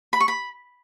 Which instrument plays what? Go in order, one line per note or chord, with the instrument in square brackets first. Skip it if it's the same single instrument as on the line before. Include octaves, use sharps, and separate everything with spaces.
[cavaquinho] B5
C#6
B5